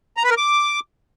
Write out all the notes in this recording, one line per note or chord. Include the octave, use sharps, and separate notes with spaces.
A#5
B4
A#4
D6